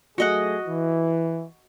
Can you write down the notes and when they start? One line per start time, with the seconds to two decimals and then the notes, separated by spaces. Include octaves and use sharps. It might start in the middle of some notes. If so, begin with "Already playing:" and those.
0.18 F#3 A3 F#4 G#4 D#5 F#5
0.66 E3